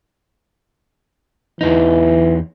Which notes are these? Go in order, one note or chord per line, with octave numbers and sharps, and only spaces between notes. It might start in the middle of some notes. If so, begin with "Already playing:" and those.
E2 E3 D#4